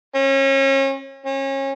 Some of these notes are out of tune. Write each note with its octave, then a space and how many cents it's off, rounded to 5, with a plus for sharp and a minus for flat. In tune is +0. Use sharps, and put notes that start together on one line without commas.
C#4 -35
C#4 -30